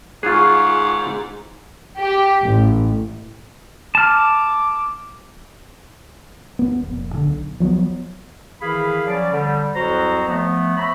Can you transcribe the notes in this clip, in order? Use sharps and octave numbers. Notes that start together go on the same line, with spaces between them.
G#2 F4 G#4 C#6 F#6
G4
A1
A5 D6 F6
D#1 B3
F1 A#2
D3
B1
F3 F#3 A3 B3
D#3 E3 E4 G#4 F5 B5
F3 F#3 C#4 D5
D3 G3
C2 F2 F#3 F#4 C5 A#5
F3 A3 B3
C5 C#5 E5 A#5 B5